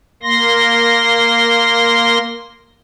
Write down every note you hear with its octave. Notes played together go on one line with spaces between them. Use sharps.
A#3 C6 A#6